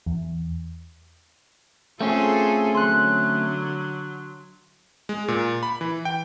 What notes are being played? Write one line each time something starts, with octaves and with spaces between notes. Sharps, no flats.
E2
A3 C4 C#4 F4 G#4 A4
D3 F#3 C6 F#6
G#3
A#2
B5
E3
G5